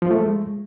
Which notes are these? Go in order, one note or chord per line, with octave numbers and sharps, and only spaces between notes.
F3
A3
G#3